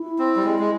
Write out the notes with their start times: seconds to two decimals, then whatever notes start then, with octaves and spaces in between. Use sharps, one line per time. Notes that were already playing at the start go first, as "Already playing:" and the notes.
Already playing: E4
0.19 C4
0.36 G3
0.44 G#3
0.59 G#3